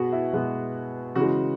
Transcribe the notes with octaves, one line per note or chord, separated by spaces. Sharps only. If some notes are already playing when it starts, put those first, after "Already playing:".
Already playing: B2 B3 F#4 G#4
E4
B2 G#3 B3
C#3 E3 G#3 F#4